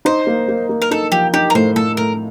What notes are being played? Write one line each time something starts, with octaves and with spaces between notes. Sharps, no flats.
D#4 C5
A#3
A#3
A#3
A#4
D#4 A4
F3 G4
D#4 G4
A#4
A2 C5
A2 A4
A2 A#4